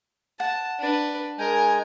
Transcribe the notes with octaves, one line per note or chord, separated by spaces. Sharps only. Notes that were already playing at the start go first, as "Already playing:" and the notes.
F#5 A5
D4 B4
G#3 A#4 G#5 G6